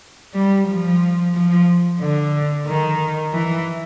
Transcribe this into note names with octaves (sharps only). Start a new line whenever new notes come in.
G3
F3
F3
D3
D#3
E3